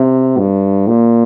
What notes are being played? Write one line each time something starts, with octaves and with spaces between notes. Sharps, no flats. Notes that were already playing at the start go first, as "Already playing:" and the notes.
Already playing: C3
G2
A#2